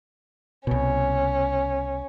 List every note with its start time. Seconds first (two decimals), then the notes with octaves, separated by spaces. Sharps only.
0.67 C2 B2 C#4